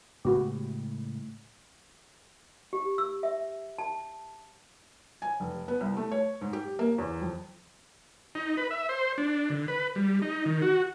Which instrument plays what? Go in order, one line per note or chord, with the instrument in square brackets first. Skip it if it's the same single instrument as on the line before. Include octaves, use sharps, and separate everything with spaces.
[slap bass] A2 C#3 G#3 [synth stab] B3 F#4 G4
[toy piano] G4
E6
E5
A5
[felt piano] G#5
F1
B3
C2
A3
C#5
G#2
G4
A#3
E2
F2
[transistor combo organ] D#4
B4
E5
C5
D4
D3
B4
G3
D#4
D#3
F#4